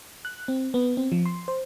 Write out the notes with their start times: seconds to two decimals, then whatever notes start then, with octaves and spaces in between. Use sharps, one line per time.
0.25 F#6
0.48 C4
0.74 B3
0.97 C4
1.12 F3
1.26 C6
1.48 C5